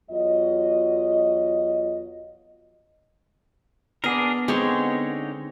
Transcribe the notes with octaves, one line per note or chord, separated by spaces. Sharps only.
E2 F#3 F4 D#5
B3 D4 G#4 A#4 D#5
D3 G#3 C4 D#4 C#5